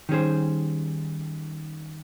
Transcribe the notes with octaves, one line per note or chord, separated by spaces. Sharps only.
D#3 G3 C#4 G#4 C5